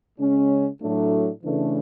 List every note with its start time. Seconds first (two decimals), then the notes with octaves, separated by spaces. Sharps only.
0.18 C#3 G#3 C#4
0.81 A2 F#3 A3 D4
1.44 C#3 E3 A3 D4